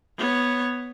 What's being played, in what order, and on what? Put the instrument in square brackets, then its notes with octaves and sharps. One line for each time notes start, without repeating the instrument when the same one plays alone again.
[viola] B3 C#5